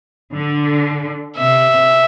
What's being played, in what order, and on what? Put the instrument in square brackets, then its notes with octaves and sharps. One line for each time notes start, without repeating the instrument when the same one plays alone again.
[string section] D3
[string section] C3 [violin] E5